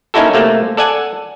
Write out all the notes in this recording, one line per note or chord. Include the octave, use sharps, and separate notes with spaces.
A#3 C#4 D#4 E4 F#4 A4
C3 A3 A#3
A4 D5 F#5 G#5